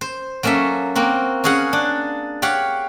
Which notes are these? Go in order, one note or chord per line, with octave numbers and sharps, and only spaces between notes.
C5
F#3 A#3 C#4 A4 E5
A#3 C4 F#4
C#4 F#4 G#4 F5 F#5
D4
G4 C#5 F5 F#5